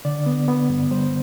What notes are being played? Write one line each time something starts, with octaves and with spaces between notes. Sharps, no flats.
D3 D5
B3
B3
G2
G3 C5